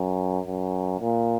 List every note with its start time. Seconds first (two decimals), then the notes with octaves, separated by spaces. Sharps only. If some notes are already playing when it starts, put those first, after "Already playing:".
Already playing: F#2
0.46 F#2
1.01 A#2